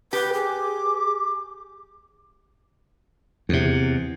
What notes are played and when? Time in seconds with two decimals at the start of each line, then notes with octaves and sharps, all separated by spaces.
0.13 G4 B4
0.33 G#4 D6
3.49 E2 C3